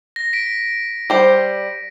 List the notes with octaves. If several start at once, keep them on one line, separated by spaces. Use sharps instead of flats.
A#6
B6 D7
G3 C5